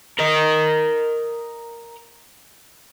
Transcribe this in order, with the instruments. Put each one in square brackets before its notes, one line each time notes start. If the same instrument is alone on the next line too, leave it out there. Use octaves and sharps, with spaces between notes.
[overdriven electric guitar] A#4 D#5